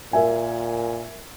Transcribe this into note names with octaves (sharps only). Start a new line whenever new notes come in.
A#2 A#4 E5 G#5